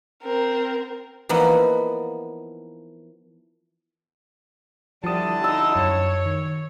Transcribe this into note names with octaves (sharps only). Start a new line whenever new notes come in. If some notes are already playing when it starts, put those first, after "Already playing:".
C4 A#4
E3 F3 A#3 B3 D#4
D3 F3 G3 E4 A5 D#6
D#4 E6
F#2 C#5
D#3